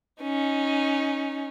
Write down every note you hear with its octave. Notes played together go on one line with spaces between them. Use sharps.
C#4 D#4